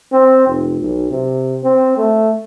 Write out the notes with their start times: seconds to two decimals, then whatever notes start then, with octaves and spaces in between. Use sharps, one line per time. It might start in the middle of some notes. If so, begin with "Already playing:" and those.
0.12 C4
0.48 F1
0.81 B1
1.11 C3
1.63 C4
1.97 A3